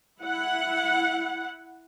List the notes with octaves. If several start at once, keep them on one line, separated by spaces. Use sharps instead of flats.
E4 F#5